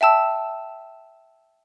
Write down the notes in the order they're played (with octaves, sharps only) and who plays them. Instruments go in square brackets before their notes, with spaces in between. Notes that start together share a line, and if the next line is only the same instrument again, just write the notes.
[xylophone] E5 G5 A5 E6